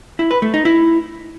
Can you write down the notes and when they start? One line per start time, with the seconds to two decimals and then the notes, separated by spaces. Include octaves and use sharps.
0.19 E4
0.31 B4
0.42 A3
0.54 D#4
0.65 E4